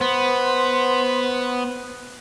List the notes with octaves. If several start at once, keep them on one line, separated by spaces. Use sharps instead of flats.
B3 C5